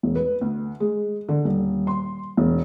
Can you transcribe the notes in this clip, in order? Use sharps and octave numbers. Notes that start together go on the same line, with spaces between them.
E1
B4
D2
G#3
D3
D#1
C6
E1